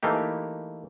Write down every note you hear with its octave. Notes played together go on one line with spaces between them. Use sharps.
E3 A3 A#3 D#4 G4